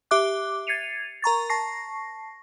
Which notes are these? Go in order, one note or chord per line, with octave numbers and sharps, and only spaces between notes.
G4 E5 D6 F#6
G#6 A6 C7 C#7 D#7 F7
A#4 A#5 C#6 A6
A5 C#6 A#6 C7